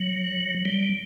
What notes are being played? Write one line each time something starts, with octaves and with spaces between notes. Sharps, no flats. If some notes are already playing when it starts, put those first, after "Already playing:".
Already playing: F#3
G3